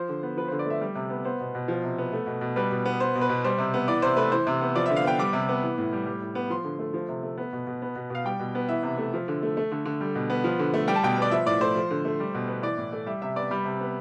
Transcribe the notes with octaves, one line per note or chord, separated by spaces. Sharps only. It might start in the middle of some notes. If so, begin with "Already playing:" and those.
Already playing: F3 C5
D3
B3
F3 B4
C5
D3
D5
A3 E5
G3
C3
B3
B3 C5
B2
B2
F3
C3
B3
A3
B2
B2
G3 B4
B2
B3
B3 C5
B2
B4
B2
G3 C5
C3
B3
E3 D5
C3 C5
A3 B4
E3 C5
C3
B3
F3 D5
E5
D3
F5
B3 G5
G3 D6
C3
B3
E3
A2
G3
G3
A2
B3
F3 C6
D3
A3
F3
C3
A3
B3
B2
B2
B3
B2
B2 F5
G3 G5
B2
B3
E3 E5
C3
A3
F3
D3
A3
A3
D3
D3
G3
B2
B3
F3
D3
A3
G3 G5
A5
B2 G5
B3 D5
F3 E5
A2 D5
A3 C5
F3
D3
A3
G3
B2
B3
E3 D5
A2
A3
G3 E5
C3 E5
B3 D5
G3 B5
C3
B3